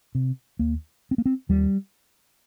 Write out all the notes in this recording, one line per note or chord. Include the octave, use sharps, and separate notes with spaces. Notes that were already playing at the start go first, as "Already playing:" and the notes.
C3
D#2 A#3
C4
A#3
C4
D#2 G3